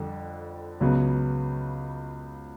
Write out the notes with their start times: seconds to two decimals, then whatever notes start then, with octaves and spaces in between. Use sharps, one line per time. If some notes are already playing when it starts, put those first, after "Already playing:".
Already playing: F2 D3 G3
0.81 C#2 C#3 F#3 B3